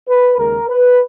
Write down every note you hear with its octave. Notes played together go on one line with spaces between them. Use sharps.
B4
D#2 C#3 G#3 A#4
B4